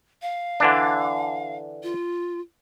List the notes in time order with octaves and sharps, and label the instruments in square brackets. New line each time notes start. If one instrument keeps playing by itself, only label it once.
[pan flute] F5
[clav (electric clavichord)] D3 E3 D4
[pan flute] F4